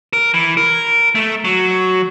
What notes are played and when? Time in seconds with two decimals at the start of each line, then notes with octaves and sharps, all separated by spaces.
0.13 A#4
0.34 E3
0.57 A#4
1.15 A3
1.45 F#3